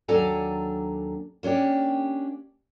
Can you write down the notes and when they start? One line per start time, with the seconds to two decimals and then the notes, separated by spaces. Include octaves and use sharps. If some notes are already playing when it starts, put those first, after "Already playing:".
0.08 D#2 F#3 D4 A4 G#5 A#5
1.43 A#3 C#4 D4 G4